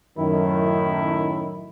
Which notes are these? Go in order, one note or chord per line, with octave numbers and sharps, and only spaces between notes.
F#2 A2 D#3 E4